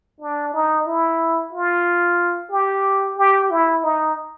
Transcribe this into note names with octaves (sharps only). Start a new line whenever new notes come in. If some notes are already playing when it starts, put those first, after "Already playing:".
D4
D#4
E4
F4
G4
G4
E4
D#4